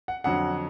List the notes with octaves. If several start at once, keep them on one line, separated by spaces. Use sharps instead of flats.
F#5
F2 D3 F#3 F#5